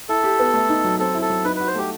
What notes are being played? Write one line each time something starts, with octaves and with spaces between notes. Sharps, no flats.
E4 A4
G4
B3
A3
D#4
F#3
C4 A4
E4
A4
F#3
D#4 B4
F#4 B4
C5
A3 G4